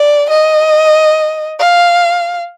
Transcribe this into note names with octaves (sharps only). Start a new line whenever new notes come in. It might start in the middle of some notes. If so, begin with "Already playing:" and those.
Already playing: D5
D#5
F5